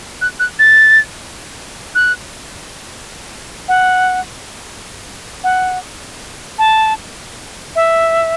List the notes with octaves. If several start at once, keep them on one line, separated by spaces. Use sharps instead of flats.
F#6
F#6
A6
F#6
F#5
F#5
A5
E5